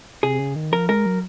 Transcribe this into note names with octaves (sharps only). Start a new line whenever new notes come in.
C3 G#4
C#3
D#3
F3 A#4
G#3 A#4
F#3